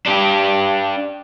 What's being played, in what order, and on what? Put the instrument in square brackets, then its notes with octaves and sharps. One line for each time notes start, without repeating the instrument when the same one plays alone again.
[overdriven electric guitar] D4 G4